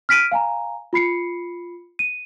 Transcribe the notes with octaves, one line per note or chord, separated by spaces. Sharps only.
F6 B6 D7 D#7
F5 G#5 A#5
F4 B5 C7 C#7
D#7